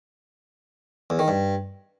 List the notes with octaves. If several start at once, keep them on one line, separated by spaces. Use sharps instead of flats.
E2
D#3
G2